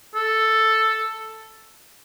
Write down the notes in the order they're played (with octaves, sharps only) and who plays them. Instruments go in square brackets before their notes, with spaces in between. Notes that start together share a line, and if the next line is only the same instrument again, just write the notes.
[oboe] A4